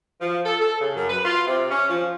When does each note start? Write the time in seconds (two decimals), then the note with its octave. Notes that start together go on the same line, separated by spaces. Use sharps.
0.21 F3
0.45 A4
0.61 A4
0.80 C#3
0.96 F#2
1.09 B4
1.25 F4
1.45 C3
1.70 C#4
1.89 F3